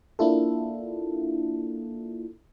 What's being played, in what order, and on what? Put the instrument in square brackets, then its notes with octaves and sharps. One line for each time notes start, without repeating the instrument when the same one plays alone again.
[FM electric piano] A#3 D4 E4 F4 A4